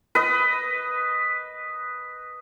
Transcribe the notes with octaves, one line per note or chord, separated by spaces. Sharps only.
B4 D#5